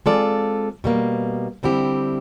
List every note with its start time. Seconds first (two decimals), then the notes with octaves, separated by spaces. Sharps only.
0.06 G#3 C4 F4 A4 D5
0.84 B2 G3 A#3
1.63 D3 G3 C4 E4 G4